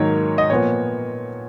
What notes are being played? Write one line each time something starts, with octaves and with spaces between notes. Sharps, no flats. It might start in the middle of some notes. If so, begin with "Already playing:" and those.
Already playing: G#2 D#3 F#3 A#3 C#5
D#5
A#2 F3 B3 C#5